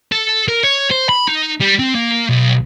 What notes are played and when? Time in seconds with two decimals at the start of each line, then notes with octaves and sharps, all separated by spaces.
0.12 A4
0.49 A#4
0.64 C#5
0.91 C5
1.09 B5
1.28 D#4
1.61 G3
1.79 C4
1.95 A#3
2.29 B1